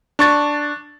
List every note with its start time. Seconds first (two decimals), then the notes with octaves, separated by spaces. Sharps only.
0.19 D4 C#6 A6